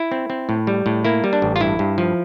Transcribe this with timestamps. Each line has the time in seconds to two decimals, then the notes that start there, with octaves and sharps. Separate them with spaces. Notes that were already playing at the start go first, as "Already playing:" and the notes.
Already playing: E4
0.12 C4
0.30 C4
0.49 A2
0.67 G3
0.86 A2
1.05 A#3 E4
1.24 G3
1.33 D4
1.42 A1
1.56 F4
1.60 G2 E4
1.79 G2
1.98 F3